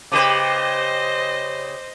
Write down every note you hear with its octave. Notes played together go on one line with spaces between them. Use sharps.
C#3 G4 B4 C5 D#5 D6 D#7 E7